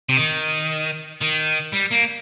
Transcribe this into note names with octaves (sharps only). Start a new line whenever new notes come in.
C3
D#3
D#3
G3
A#3